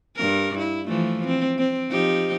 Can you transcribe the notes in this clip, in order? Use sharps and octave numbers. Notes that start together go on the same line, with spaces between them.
G2 A#4
E4
E3 F3 A3
C4
C4
F3 D#4 G4